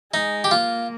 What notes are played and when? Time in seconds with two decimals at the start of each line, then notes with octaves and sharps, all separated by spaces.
0.13 G#3 D#4
0.44 G4
0.51 A#3 F4